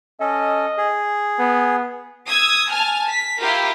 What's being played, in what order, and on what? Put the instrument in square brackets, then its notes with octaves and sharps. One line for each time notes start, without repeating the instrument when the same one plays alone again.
[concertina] C#4 A4 [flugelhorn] D#5
[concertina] G#4
[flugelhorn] B3
[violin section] D#6 E6 G#6
G#5 A5 F6
B6
E4 F4 G4 A#4